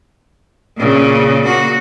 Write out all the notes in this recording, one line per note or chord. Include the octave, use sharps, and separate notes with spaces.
A#2 C#3
A#3 F#4